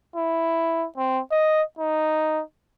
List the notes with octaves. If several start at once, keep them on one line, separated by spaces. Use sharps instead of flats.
E4
C4
D#5
D#4